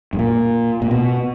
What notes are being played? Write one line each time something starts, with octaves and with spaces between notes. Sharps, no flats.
G2
A#2
A#2
B2